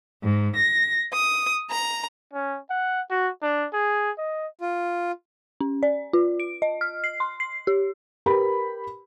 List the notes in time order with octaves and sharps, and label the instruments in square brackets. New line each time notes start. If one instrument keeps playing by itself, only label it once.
[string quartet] G#2
A#6
D#6
A#5
[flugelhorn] C#4
F#5
F#4
D4
G#4
D#5
[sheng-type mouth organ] F4
[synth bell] C#4
D5
F4
D7
D#5
F6
C7
C6
C7
G4
[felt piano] G4 A#4 B4 B5